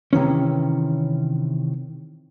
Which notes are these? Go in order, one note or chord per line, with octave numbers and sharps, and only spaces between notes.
C3 D#3 E3 C#4